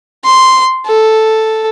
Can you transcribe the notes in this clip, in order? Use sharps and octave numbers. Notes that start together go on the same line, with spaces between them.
C6
A4